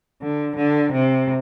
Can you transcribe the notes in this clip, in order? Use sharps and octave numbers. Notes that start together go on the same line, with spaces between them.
D3
D3
C3